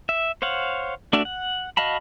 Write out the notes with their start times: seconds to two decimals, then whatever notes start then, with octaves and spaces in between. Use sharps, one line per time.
0.09 E5
0.42 C5 C#5 F5 F#5
1.13 A3 D4 F#4 D5 E5
1.25 F#5
1.77 F#4 D#5 F5 A5 B5